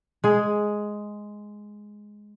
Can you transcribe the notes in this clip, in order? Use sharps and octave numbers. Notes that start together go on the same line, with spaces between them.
G#3 G#4